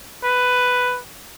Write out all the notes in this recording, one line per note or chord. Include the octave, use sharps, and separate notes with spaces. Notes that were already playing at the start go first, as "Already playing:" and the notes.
B4